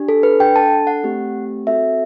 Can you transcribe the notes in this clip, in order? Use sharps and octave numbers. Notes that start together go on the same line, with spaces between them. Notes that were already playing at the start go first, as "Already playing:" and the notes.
Already playing: D4 G4
A4
B4
D4 A4 G5
A5
F#5
A3 C4 G4
C4 F#4 A4 E5